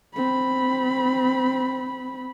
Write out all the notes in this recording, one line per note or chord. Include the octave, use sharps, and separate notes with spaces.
C4 B5